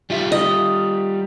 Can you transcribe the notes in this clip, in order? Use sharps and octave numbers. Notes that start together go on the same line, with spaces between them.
G3 F4 E5
D#5